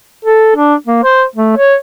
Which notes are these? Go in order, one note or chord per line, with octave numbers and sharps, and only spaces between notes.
A4
D4
A#3
C5
A3
C#5